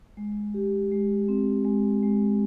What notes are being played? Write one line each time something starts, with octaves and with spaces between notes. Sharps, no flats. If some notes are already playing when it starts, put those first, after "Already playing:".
G#3
G4
G#3
C4
G#3
G#3